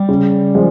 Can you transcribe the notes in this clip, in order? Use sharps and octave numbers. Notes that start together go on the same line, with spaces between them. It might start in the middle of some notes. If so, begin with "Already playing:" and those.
Already playing: G3
C#3
F3 G#3